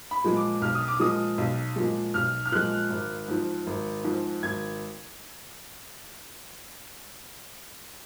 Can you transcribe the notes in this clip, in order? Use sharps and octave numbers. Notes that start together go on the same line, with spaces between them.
B5
A#2 F3 G#3
D6
B1 F6
D#6
D6
A#2 F3 G#3 D#6
B1
A#2 F3 G#3
B1 F6
F6
A#2 F3 G#3 F#6
G#1
G#2 F3
G#1
G#2 F3
G#1 G#6